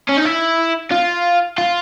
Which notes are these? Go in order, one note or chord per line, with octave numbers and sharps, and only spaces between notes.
C#4
D#4
E4
F4
F4